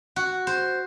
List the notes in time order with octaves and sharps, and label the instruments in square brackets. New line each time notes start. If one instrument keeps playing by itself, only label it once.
[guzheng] F#4
C5